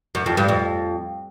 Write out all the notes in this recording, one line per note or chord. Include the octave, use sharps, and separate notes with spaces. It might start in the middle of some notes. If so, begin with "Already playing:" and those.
F#2
F2
G2
F2